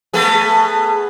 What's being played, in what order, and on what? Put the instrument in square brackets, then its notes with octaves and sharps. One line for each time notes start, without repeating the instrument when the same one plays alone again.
[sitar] A3 B3 G#4